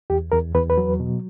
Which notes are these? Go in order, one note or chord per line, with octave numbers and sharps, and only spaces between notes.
E2 G4
E2 A#4
E2 B4
B4
F#3
B2